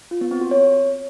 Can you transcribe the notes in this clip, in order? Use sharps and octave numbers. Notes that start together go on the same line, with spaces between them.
F4
B3
C4
F#4
C#5